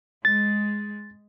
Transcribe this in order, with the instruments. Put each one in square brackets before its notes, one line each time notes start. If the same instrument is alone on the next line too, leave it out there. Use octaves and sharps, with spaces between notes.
[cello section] G#3 [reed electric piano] A6